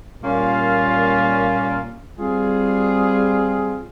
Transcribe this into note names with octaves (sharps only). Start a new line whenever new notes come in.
A#2 G3 A#3 C#4 F4
G3 C4 F4 G#4